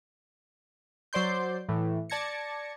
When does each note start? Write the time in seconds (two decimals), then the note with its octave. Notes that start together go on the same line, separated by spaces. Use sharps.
1.13 F#3 C5 D5 C6 G6
1.69 A2 E3
2.10 D5 A5 G#6 A#6 C#7